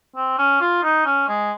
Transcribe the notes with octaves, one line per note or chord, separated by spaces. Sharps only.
C4
C#4
F4
D#4
C#4
G#3